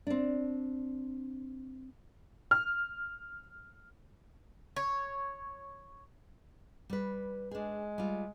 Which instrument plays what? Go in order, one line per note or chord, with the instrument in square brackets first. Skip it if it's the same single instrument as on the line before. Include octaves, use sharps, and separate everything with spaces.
[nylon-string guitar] C4 D4
[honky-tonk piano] F6
[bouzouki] C#5
[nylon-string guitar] G3 B4
[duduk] G#3 [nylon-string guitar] D4 G#4
[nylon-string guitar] G3 F4